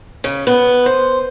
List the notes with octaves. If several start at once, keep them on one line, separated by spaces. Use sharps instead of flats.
C#3
B3
C5